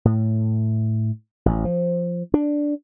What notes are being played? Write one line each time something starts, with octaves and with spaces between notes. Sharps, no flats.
A2
A1
F3
D4